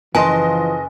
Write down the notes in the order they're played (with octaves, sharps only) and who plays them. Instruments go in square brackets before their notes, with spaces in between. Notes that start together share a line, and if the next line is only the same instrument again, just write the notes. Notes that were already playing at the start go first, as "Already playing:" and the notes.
[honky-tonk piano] F#1 D#5 C6 [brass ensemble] E3 F3 [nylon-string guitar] B4 A5 [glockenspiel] G#5